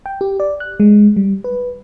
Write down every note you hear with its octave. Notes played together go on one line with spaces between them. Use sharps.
G5
G4
D5
F#6
G#3
G3
B4